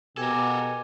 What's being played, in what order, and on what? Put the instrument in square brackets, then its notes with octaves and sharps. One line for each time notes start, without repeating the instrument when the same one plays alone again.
[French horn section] B2 [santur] G4 [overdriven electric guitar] A4 A#4 [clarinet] G#5